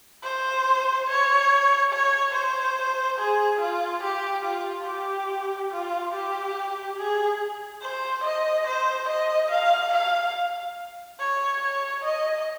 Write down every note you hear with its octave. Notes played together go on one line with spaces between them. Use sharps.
C5
C#5
C#5
C5
G#4
F4
G4
F4
G4
F4
G4
G#4
C5
D#5
C5
D#5
F5
F5
C#5
C#5
D#5